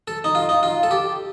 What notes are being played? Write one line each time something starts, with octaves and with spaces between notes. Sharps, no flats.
A4
D#4
F4
D#4
F4
A4
G4